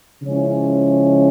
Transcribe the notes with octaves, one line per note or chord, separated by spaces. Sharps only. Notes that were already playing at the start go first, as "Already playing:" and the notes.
C#3 F3 G#3 C#4 E4